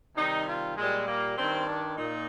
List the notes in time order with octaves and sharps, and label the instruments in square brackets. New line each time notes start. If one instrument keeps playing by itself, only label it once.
[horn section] C3 D#3 G3 D#4
F4
A#2 G3 G#3
A#3
G2 D#3 G3 C4
D4
A#2 D#4